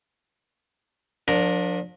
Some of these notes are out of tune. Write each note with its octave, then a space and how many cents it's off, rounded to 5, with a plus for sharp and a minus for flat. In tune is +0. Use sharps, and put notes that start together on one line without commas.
F3 +35 D4 +0 A#4 +0